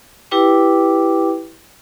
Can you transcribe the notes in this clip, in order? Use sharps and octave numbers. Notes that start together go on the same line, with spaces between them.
E4 G4 B4 G5 D6